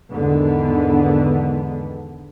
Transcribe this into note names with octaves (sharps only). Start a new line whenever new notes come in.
E2 G#2 D3 D#3 B3